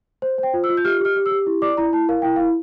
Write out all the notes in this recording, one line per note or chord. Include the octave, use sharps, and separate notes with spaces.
C5
C5
G5
F4
E6
F4
G6
G4 F6
G4 F6
G4
E6
G4
E4
D5 D6
E4 A#5
E4 A5
A#4 F5
E4 G5
E4 F5